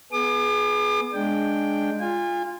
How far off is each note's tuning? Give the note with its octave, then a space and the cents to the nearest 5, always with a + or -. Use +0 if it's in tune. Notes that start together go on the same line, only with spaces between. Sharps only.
B3 +0 G#4 +20 D6 +40
G#3 +0 D4 +0 G5 +0
F4 +0 G#5 -35